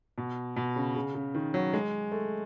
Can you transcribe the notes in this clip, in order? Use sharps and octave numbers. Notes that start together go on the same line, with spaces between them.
B2
B2
C#3
C#3
C#3
D#3
F#3
G#3
A3